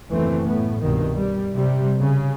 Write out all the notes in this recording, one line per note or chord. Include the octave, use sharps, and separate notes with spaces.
F#1 D#2 E3 A3 C4
A2 B3
C2 G2 B2 D#3
G3
C3 G3
C#3